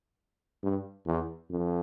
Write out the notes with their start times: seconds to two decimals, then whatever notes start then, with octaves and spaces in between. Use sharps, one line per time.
0.63 G2
1.06 E2
1.50 F2